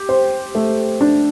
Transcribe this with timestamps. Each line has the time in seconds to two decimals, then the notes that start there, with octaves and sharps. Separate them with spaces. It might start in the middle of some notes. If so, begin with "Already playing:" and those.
Already playing: G4
0.09 C5
0.55 A3
1.01 D4